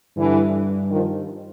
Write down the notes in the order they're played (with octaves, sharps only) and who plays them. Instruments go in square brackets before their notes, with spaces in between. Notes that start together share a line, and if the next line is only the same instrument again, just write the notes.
[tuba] G2 [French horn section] D3 E3
[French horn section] D#3 F3